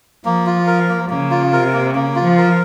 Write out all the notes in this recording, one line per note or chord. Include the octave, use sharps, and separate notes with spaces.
F3 A#3
F4
A#4
A#3
C#3 A#3
F4
C3 A#4
A#3
C#3 A#3
F4
F3
A#4